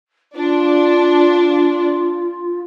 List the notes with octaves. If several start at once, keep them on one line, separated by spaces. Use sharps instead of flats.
D4 F4